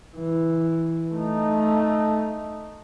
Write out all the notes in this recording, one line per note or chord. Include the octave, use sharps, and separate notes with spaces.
E3
A3 D#4